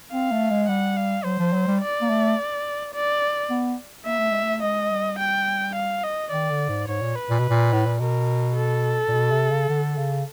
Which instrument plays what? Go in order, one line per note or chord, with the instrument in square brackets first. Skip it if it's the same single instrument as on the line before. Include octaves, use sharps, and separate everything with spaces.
[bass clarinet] C4 [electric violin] F5
[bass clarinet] A3
G#3
[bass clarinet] G3 [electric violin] F#5
[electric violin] F5
[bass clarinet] F#3 [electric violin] C5
[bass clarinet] F3
F#3
G3
[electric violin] D5
[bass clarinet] A#3
A3
[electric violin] D5
[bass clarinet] B3
[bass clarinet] A#3 [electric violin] E5
[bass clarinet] A3
G#3
A3
[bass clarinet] G#3 [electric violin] D#5
[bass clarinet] G3
[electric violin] G5
F5
D#5
[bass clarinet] D#3 [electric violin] D5
[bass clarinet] D3
G#2
[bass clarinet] G#2 [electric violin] C#5
[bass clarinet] A#2
[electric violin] B4
[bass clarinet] A#2
B2
A#2
A2
A#2
[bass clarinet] B2 [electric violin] A#4
[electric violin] A4
[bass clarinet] A#2
B2
C3
C#3
D3
C#3